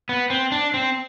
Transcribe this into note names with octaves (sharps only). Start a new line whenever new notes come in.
B3
C4
D4
C4